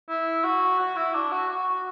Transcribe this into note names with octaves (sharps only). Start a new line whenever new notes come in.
E4
F#4
F#4
E4
D4
F#4
F#4